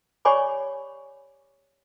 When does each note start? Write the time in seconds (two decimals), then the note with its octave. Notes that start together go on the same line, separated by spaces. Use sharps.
0.25 G4 C#5 D5 G#5 B5 D6